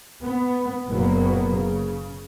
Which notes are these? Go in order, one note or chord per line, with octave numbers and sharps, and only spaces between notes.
B3
F#1 A#2 F#3 A#3 B3
C#3